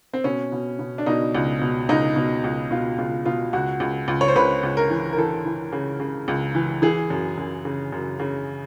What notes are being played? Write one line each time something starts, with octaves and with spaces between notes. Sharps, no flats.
C4
B2 C#4
B2
B2
D4
B2 D#4
C#2
B2
C#2 D#4
B2
C#2
B2 F4
C#2 F4
B2 F4
C#2 F#4
C#2
C#2
C#5
C5
C#2 B4
C#2
A#4
E3
A#4
E3 A4
E3
C#3
C#3
C#2
E3
E3 G#4
F#2
F#2
C#3
F#2
C#3